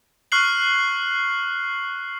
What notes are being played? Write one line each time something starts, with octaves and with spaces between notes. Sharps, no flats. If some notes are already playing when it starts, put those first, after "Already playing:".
C#6 F6 F#6 C7 F#7